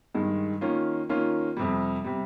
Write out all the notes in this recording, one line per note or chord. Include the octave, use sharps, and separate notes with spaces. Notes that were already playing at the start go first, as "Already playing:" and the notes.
G2 D#3 G#3
D#3 A#3 C#4 F4
D#3 A#3 C#4 F4
F2 C3 G3
C3 G3